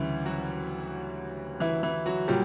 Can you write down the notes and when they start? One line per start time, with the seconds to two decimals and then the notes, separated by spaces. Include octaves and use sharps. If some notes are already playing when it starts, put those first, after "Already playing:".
Already playing: D2 C#3 E3 G3 E4
0.25 F#3 F#4
1.60 E3 E4
1.83 E3 E4
2.06 F#3 F#4
2.28 A#2 F#3 G3 G4